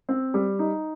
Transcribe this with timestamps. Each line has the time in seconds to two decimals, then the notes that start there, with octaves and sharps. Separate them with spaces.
0.09 C4
0.34 G3
0.59 D#4